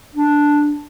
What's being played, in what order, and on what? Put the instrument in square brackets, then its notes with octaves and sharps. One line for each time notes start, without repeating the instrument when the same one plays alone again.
[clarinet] D4